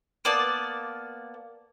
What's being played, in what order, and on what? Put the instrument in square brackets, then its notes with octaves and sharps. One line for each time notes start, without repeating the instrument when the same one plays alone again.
[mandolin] A#3 B3 D5 A5